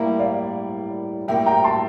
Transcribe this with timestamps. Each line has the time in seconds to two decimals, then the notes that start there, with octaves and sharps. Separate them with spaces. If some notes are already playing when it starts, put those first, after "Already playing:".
Already playing: A2 G3 A#3 E4 F5
0.19 D5 F5
1.28 A2 G3 A#3 E4 G4 E5 G5
1.46 G5 A#5
1.64 A5 C6